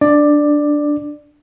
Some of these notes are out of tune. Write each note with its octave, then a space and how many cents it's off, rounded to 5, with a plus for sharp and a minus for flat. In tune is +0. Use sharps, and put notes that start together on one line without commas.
D4 +0 D5 +10